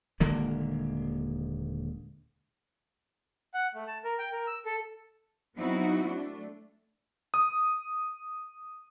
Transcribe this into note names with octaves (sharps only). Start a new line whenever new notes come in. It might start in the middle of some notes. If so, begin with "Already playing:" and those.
D#1 D3 G#3 A#3
F#5
A3
A5
A#4
G5
A#4
E6
A4
F#3 B3 C4 D#4 E4 F#4
A3 D4
D#6